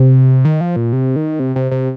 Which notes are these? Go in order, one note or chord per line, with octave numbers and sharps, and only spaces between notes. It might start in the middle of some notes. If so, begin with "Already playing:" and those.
Already playing: C3
D#3
F3
A#2
C3
D#3
C3
C3
C3